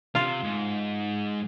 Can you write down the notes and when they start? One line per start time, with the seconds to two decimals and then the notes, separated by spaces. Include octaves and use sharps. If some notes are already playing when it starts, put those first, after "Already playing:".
0.15 C3 F4
0.43 G#2